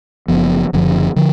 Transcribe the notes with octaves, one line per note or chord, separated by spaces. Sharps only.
F#1 F#2 F3 B3
F#1 F#2 D3 F3
D3 F3